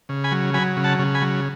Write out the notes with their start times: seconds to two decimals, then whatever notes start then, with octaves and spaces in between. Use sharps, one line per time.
0.09 C#3
0.24 G#5 B5
0.32 F#3
0.54 F#3 G#5 B5
0.77 C#3
0.84 F#5 A5
0.99 C#3
1.15 G#5 B5
1.22 F#3